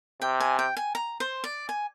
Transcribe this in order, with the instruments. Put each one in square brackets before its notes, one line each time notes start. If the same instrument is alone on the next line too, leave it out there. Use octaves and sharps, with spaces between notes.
[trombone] C3 [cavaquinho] G5
[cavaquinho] G#5
G5
G#5
A#5
C5
D5
G#5